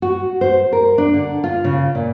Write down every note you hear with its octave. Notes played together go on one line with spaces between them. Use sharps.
F#4
C5
A#4
D4
D3
F4
C#3
A#2